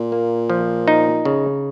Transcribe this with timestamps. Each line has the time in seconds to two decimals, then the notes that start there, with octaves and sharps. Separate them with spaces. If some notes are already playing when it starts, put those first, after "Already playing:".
Already playing: A#2
0.12 A#3
0.50 F3
0.88 D#4
1.25 C#3